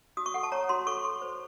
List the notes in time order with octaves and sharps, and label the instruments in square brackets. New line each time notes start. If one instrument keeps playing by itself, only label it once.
[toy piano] F#4 D#6
C#6
A4 F#5
A5
C#5 A#5
F#4 C6
A4 C#6
A4
C5